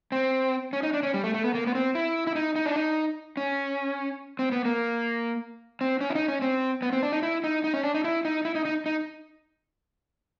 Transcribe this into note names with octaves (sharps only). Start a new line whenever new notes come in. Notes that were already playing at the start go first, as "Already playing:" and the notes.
C4
C#4
D#4
D4
C#4
G3
A3
A3
B3
A#3
B3
C4
E4
E4
D#4
D#4
D4
D#4
C#4
C4
B3
A#3
C4
C#4
E4
D#4
C#4
C4
B3
C4
D4
D#4
E4
D#4
D#4
C#4
D4
D#4
E4
D#4
E4
D#4
D#4
D#4